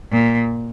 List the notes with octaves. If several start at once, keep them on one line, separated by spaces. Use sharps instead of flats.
A#2